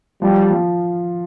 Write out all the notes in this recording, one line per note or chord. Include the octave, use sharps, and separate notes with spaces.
F3 G3
F3